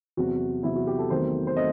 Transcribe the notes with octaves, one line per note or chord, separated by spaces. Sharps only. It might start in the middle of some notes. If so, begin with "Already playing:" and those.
E2 C3 F#3 C4 F#4
E2 C3 F#3 C4 E4
F#4
G4
A4
E2 D#3 F#3 A3 C4 C5
C5
A3 C4 D#5